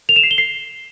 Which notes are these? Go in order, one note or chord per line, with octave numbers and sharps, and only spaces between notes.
F7
E7
C7
G7
C7